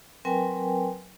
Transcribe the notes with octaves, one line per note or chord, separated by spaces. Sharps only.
F#3 C4 A#4 B4 G5 G#5